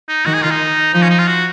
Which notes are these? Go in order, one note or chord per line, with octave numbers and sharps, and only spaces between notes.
D#4
D#3 F#4
G#4
F4
D#4
F3 D#4
C#4
D#4
F4
F#4